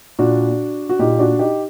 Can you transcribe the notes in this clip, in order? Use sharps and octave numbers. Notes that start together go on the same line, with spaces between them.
A#2 D4 F#4
F#4
A#2 D#4 G4
D4 F#4
D#4 G4